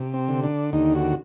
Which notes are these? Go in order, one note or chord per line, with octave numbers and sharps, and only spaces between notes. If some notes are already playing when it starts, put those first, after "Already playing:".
Already playing: C3
C4
D3
D4
D#2 D#4
F#4